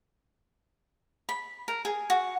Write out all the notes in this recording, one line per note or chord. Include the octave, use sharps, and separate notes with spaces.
B5
A#4
G#4
F#4